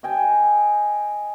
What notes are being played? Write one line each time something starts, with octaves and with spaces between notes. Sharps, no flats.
D#5 G5 G#5